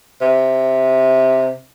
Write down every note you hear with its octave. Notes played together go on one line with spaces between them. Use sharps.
C3